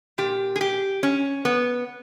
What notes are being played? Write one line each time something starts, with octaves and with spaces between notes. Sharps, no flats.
A#2 G4
G#4
G4
C#4
B3